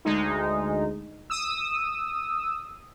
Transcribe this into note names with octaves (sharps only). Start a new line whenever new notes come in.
D2 G#3 D#4
D#6 E6